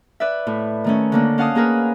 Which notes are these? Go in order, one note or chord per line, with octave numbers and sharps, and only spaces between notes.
B4 D5 E5
A2
D#3 A3 C#4
D3 A#3 D4
C#4 F5 F#5 A5 D#6
A#3 G#4 A#4 B4